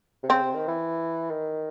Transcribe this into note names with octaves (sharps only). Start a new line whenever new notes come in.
C3
C#3 C4
C3
D#3
E3
D#3